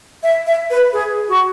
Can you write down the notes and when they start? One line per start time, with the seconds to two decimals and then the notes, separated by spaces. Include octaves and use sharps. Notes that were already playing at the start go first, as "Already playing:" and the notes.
0.23 E5
0.47 E5
0.70 B4
0.93 G#4
1.29 F#4